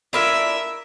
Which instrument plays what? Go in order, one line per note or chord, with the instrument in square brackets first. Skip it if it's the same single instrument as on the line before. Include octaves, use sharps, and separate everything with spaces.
[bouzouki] D4 E4 F4 [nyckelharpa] A#4 E5